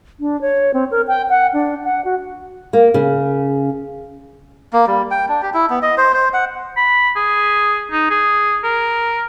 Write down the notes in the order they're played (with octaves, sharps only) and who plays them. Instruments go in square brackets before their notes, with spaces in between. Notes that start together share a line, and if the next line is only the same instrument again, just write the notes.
[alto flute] D4
C#5
C4
A#4
G5
F#5
D4
F#5
F#4
[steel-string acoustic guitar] A#3
C#3
[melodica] A#3
G3
G5
D4
G4
E4
B3
D#5
C5
C5
F#5
[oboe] B5
G#4
D#4
G#4
A#4